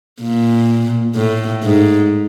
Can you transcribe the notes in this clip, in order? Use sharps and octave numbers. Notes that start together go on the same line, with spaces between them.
A#2
A2
G#2